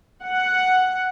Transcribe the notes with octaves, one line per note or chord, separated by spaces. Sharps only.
F#5